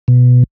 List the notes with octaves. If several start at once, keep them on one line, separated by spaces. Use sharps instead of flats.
B2